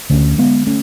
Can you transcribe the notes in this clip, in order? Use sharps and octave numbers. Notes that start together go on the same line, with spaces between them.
D2 D3 A3 C#4
G#3 B3
A3 C#4